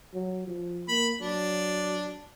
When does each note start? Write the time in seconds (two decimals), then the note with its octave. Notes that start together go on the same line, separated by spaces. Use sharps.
0.14 F#3
0.47 F3
0.89 A#3 B5
1.21 F#3 D4